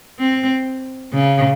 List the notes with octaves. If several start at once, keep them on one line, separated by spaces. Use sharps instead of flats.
C4
C#3